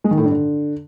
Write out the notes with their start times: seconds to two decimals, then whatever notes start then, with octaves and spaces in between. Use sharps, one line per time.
0.04 G#3
0.11 D#3
0.18 A2
0.24 G2
0.31 D3